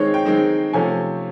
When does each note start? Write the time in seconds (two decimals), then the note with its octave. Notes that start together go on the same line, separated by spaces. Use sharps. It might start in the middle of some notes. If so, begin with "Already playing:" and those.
Already playing: D#3 G#3 C4 D#4 C#5
0.14 G5
0.25 D#3 G#3 C4 D#4
0.73 C3 F3 A3 C#4 G#5